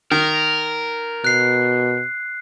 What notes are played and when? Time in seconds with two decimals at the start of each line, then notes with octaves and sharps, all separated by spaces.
0.11 D#3 A#4
1.24 B2 F#6 C7